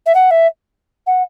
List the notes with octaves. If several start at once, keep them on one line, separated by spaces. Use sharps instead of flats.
E5
F#5
E5
F#5